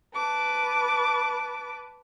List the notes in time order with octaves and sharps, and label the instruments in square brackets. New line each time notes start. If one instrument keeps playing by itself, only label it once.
[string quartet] B4 A5 D6